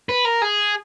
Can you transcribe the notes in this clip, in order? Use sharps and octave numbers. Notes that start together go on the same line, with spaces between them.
B4
A#4
G#4